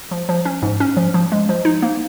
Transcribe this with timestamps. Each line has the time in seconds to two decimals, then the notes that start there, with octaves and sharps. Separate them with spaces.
0.11 F3
0.29 F3
0.45 C#4
0.62 G#2
0.80 C#4
0.97 F3
1.14 F3
1.32 G#3
1.49 F3
1.65 D#4
1.82 A#3